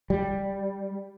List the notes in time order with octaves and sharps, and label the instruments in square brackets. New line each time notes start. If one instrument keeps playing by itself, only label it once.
[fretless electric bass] G3